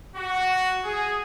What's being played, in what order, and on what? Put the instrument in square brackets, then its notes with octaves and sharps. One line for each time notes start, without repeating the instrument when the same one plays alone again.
[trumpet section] F#4
G#4